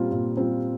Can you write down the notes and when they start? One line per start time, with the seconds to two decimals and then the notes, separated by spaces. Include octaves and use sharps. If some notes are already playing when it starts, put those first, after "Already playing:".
Already playing: A#2 G3 C4 F4
0.12 A#2
0.37 G3 C4 F4